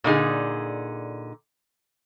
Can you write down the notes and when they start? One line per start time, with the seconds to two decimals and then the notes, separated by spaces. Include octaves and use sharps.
0.04 A#2 D3 D#4 G#4